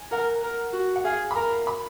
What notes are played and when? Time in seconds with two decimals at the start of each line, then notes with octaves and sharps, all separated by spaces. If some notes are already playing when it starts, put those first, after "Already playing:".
Already playing: G#5
0.11 A#4 F#5
0.43 A#4
0.73 F#4
0.96 F#5
1.05 G#4 F5
1.31 B5
1.36 A#4 A#5
1.67 B5